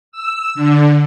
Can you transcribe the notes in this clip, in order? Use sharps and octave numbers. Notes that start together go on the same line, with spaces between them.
E6
D3